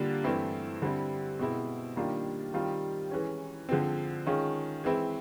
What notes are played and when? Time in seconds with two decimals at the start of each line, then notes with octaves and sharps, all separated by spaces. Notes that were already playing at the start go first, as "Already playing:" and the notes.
Already playing: D3 G3 A#3 D4 F4
0.24 G2 E3 A3 C4 E4
0.82 D3 G3 C4 E4
1.39 B2 G#3 C4 E4
1.96 D#3 G3 A#3 D4 F4
2.54 D#3 G3 C4 F4
3.11 E3 G#3 C#4
3.69 D3 F3 G#3 C4
4.26 D#3 G#3 C#4 F4
4.84 E3 G#3 C4 E4